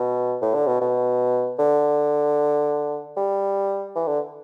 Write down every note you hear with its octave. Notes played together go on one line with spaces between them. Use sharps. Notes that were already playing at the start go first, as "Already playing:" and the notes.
Already playing: B2
A2
D3
B2
B2
D3
G3
E3
D3